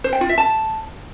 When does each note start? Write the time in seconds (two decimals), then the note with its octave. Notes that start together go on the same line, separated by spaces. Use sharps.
0.04 C5
0.13 G5
0.21 F4
0.29 E5
0.38 A5